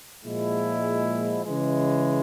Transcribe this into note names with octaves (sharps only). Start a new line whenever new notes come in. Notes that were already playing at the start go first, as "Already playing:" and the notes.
A#2 F3 G#3 E4
C#3 E3 G#3